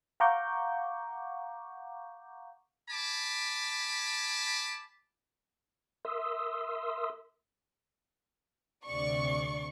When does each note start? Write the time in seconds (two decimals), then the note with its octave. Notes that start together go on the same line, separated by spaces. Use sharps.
0.20 F5 F#5 A#5 C#6 D6 G6
2.89 G#5 A5 B5 D6
6.05 A#4 E5 C6 D#6 E6
8.86 D2 C3 D5 C#6